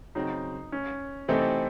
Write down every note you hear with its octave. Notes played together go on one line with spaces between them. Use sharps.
C#3 F#3 C4 D#4
C#4
C3 E3 A3 C4 D#4 A4